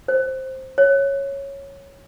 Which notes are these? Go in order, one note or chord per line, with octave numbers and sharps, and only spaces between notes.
C5
C#5